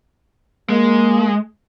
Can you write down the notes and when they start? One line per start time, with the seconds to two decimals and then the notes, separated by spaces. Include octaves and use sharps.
0.69 G#3 A#3